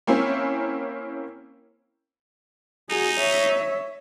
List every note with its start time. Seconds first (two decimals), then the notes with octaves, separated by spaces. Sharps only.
0.07 A#3 C4 C#4 E4
2.90 D#4 F#4 G#4
3.20 C#5 E5